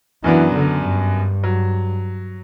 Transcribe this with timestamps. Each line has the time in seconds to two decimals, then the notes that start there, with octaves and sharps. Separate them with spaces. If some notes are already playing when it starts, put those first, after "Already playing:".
0.24 F#2 E3 F#3 B3 D4
0.54 D3
0.84 G2
1.44 F#3